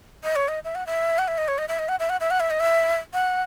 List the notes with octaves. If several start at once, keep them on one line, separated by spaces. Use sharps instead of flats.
D#5
C#5
D#5
E5
F#5
E5
F#5
E5
D#5
C#5
D#5
E5
D#5
F#5
E5
F#5
E5
F#5
E5
D#5
E5
F#5